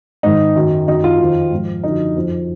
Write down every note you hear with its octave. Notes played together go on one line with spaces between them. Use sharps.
G#2 D#3 D#4
F#2 D#3
F#2 D#3 D#4
F4
F2 D#3
G#2 F3
F#2 D3 F3 D#4
F2 F3